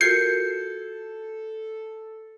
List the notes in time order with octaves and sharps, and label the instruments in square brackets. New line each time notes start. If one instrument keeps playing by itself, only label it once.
[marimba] F4 F#4 A#4 [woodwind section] A4 [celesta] G6 G#6 C#7 [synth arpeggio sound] C7